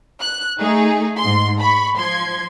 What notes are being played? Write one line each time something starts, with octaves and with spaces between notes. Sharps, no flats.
F#6
A3 D#4 G#4
G#2 C6
B5 C#6
F3 C6 G#6